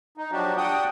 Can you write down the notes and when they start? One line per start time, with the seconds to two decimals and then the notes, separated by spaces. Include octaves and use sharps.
0.18 D#4
0.32 F3 F#3 D4 F#4 G4
0.57 D4 F#4 F#5 G5 D#6 G6